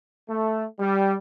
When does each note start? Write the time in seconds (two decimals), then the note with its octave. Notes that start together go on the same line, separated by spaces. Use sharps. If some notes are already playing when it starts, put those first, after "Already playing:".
0.30 A3
0.80 G3